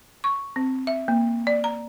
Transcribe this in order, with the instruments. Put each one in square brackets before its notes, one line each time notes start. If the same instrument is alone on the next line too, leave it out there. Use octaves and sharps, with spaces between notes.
[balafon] C#6
C4
E5
A#3
D5
A#5